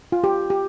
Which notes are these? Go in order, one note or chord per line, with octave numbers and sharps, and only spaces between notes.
F4
G4
G4